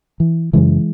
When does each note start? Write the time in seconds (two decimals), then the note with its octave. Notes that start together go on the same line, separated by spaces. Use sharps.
0.20 E3
0.53 F#2 C#3 E3 G#3